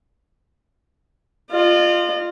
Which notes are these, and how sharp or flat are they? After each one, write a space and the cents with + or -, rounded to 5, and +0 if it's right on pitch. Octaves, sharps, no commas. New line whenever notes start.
F4 +0 D#5 -40